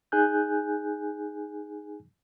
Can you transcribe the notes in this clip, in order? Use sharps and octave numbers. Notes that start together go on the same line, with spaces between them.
D#4 G#4 G#5 F#6 G6